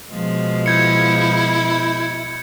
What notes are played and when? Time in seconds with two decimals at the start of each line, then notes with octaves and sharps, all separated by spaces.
0.11 B2 F3 G#3
0.66 E4 G6 G#6 C#7